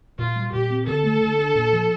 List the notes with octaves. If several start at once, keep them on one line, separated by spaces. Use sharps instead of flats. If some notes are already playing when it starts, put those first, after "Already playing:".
A#2 F4
G3
A#2 G4
C4
D3 A4
A3
D3
D4
A#2
F3